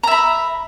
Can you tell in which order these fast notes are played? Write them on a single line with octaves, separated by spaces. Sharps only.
A#5 E5 B5